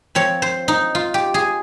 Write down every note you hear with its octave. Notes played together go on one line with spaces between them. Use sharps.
F3 C4 C#5
C5
D#4
F4
G4
G#4